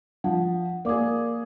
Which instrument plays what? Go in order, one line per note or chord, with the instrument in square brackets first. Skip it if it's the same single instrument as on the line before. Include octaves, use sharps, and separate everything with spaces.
[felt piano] F3 [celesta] F#5
[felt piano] A#3 G#4 [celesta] A#4 D5 D6